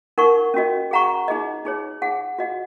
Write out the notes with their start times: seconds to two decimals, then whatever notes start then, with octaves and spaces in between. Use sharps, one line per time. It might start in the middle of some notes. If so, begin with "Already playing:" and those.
0.18 D#4 A#4 F#5 C#6
0.54 C#4 F#4 D#5
0.91 G#4 F#5 A#5 C#6
1.28 D#4 G#4 D#5
1.65 D#4 G#4 C#5
2.02 D#4 G#4 F#5
2.39 F#4 D#5 F#5